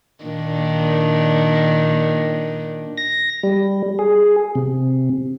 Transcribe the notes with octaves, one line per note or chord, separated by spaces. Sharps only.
A#2 D#3 D4
A#6
G3
G#4
C3